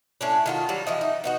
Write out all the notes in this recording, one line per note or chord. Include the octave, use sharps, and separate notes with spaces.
A2 C#4 D4
D#3 F4 F#4
F#3 G3 F#4
E3 F3 D#5
D#4
B3 D#4 F#4